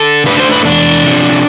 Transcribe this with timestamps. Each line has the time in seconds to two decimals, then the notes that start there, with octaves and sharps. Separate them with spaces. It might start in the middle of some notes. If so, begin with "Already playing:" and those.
Already playing: D3 A4
0.26 A3 D4 B4
0.40 C5
0.52 B4
0.65 E2 D4
1.04 C3 F3